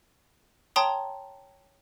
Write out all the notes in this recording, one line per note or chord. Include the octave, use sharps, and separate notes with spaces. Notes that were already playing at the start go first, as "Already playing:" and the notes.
C#5 G5 A5 A#5 C6 D#6